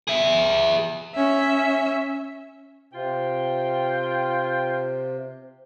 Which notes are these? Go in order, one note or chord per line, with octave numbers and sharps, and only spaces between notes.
G#4 E5
C#4 E5
C3 F4 G5